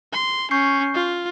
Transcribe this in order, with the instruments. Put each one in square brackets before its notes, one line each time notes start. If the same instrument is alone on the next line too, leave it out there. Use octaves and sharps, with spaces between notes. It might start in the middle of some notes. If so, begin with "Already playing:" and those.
[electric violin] C6
[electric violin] C#4 [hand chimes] C#6 G6 C7
[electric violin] F4